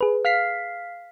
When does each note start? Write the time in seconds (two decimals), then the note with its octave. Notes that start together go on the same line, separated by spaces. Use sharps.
0.01 G#4 B4
0.25 F5 F6 B6 C7